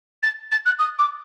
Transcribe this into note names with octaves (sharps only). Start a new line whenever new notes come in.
A6
A6
F#6
D#6
D6